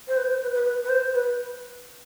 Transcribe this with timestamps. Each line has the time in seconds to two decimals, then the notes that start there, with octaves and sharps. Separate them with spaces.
0.08 C5
0.17 B4
0.30 C5
0.42 B4
0.54 B4
0.65 B4
0.84 B4
0.89 C5
1.14 B4